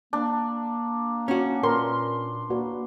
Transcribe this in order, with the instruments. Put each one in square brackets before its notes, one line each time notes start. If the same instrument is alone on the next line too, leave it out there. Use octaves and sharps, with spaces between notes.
[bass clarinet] A#3 [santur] D4
[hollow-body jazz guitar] C#4 F#4
[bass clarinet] A#2 [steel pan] A#4 B4 [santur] C6
[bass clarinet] A#3 [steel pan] F#4 B4 D5